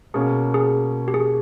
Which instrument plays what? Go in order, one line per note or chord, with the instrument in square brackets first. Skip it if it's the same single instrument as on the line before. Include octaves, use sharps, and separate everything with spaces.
[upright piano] B2 A#3 C#4 [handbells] G#4
[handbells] G#4
G4
G#4